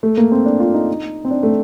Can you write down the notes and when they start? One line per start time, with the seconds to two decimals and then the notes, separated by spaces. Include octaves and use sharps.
0.03 A3
0.17 A#3
0.32 C4
0.46 D4
0.60 F4
0.74 D#4
1.25 C4
1.31 D4
1.43 A3